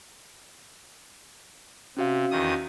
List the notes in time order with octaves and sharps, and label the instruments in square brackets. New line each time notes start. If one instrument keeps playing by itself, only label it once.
[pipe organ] C3 [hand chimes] C#4 F#4 F5
[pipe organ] E2 D#3 D#6